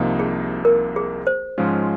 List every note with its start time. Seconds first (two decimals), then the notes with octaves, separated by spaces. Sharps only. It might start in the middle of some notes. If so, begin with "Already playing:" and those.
Already playing: C2 C3 F3 A#3 D#4
0.19 G#4
0.65 A#4
0.96 G#4
1.27 C5
1.58 G#2 F3 G#3 C#4 F4